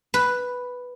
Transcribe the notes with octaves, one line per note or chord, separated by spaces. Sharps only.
B4